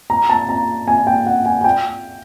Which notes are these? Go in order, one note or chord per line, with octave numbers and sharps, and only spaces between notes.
A#5
A5
A#5
G#5
G5
F#5
G#5
G#5
G5